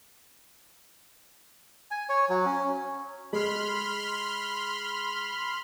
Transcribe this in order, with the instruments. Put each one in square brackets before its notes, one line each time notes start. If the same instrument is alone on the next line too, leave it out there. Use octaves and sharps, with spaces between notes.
[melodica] G#5
C#5
F#3
C#4
[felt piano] G#3 [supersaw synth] B5 C6 F6